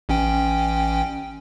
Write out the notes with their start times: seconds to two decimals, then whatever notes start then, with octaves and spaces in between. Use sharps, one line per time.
0.09 A1 C#4 G5